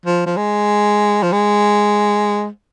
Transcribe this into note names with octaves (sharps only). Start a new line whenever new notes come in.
F3
F3
G#3
F3
G#3